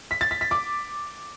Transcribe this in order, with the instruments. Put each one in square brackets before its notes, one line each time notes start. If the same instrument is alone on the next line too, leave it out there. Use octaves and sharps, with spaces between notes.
[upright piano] B6
A6
B6
B6
D6